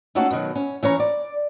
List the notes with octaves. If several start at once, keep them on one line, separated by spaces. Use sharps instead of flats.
A3 A#3 C#4 D#4 F#4 A4
B2 D#3 F#3
C#4
E3 C#4 C#5 A#5
D5